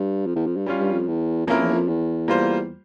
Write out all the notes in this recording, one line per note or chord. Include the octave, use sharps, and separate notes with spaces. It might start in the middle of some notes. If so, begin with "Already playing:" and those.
Already playing: G2
F2
E2
F2
G2
G3 C#4 F4
G2
F2
E2
F2 F3 A#3 C#4 E4 A#4
E2
F2
E2
G3 A#3 F4 C5